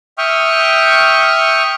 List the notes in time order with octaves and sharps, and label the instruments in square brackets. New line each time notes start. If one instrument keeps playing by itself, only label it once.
[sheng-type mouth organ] E5 G5 C#6 D#6 F6